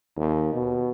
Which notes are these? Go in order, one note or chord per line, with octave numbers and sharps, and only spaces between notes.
D#2
B2